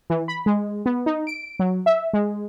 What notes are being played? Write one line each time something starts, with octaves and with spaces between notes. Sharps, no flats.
E3
B5
G#3
B3
D#4
D7
F#3
E5
G#3